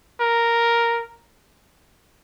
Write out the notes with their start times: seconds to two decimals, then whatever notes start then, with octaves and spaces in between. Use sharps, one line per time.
0.21 A#4